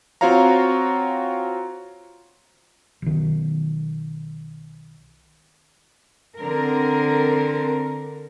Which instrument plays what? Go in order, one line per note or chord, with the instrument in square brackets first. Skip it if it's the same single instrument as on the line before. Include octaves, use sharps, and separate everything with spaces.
[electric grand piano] C4 F4 F#4 C#5 F5 A#5
[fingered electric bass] B1 D#3
[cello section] D3 C4 A#4